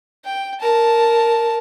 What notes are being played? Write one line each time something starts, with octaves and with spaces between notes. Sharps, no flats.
G5
A#4 A5